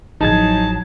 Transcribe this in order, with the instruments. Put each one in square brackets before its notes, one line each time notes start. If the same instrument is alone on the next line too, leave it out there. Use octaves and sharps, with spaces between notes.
[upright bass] A1 F3 [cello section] F#3 [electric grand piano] D#4 G#4 G#6 [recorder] A5